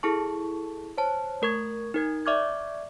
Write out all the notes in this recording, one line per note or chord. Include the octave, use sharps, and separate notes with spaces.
E4 G#4 A4 A5 C#6
C5 C#5 A5
A3 A#4 C#6 G#6
D#4 A#4 G#6
D5 E5 C#6 D6 F6 G#6